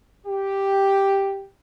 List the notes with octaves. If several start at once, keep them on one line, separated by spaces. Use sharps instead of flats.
G4